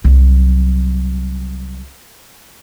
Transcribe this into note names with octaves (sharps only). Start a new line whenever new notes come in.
C2 F#3